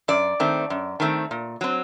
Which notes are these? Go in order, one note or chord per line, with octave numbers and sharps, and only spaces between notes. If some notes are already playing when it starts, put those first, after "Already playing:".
F#2 D5
D#3 A3 C4
F#2
D#3 A3 C4
A#2
F#3 C4